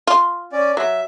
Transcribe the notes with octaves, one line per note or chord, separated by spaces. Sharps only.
F4
C#4 D5
F#3 E5